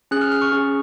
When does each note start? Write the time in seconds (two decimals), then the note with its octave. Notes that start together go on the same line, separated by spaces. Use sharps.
0.11 C#4 G#4 F#6
0.21 F6
0.32 F6
0.42 C#6
0.52 C#4 G#4